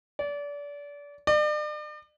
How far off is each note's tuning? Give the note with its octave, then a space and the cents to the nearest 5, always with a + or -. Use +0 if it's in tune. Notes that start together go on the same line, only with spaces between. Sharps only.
D5 -30
D5 +40